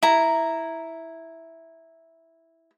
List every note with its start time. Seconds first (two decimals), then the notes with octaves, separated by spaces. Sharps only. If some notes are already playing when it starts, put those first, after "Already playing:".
0.03 E4 A#5